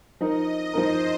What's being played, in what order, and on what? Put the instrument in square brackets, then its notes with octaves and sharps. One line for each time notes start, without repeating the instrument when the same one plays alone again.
[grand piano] F3 D#4 A#4 [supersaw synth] D#5
[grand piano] F3 D#4 A#4 [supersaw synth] C5